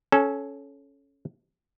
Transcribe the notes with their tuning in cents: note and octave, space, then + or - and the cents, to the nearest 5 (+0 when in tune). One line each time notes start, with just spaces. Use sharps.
C#4 +0 A4 -20